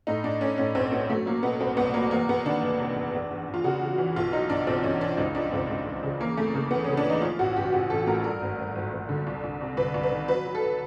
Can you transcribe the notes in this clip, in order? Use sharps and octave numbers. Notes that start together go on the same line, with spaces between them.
A2 D#4
A2 D4
A2 C#4
A2 C#4
B1 C4
A2 B3
F#3 A3
F#3 A#3
B2 B3
C2 C4
C2 B3
F#3 A#3
E2 A#3
E2 B3
D#3 D4
F1
C3
E2
E2
E2
E2
F4
C#3 F#4
C#3
E3
B1 F4
F#3 D#4
B1 D4
B1 C4
B1 C#4
B1 D4
C#2 D#4
F3 D4
C#2 C4
C#2
C#2
C#3
E3 A#3
F2 A3
C#3 A#3
E3 B3
C#3 C#4
D4
E3 D#4
F3 F4
A1 F#4
A1 G4
A1 G4
A1 A4
A2 A#4
G2 A#4
G#1
G#1
G#1
G#1
D3
C2
C2
C3
C2 B4
C2
B4
D#3
F#3 B4
F#3
A4